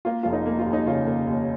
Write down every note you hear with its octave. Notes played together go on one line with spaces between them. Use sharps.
A#3 F4
F1 F4
D#4
A#3
F4
D#2
D#4
C#3 F4
A#3
D#2